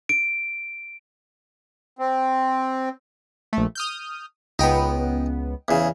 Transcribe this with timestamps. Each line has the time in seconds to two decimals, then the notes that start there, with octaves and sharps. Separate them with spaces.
0.09 D7
1.99 C4
3.53 A#1 A3
3.75 D#6 F6 G6
4.59 C#2 B3 D#4 G5
5.68 E2 C#3